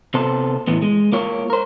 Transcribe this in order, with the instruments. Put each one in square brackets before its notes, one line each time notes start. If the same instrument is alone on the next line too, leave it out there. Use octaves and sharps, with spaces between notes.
[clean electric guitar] C3 B3 A4 C5
A2 E3 B3
G#3
A#3 F4 C#5
A#4 C5